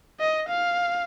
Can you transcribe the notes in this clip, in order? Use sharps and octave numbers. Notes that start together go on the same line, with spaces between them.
D#5
F5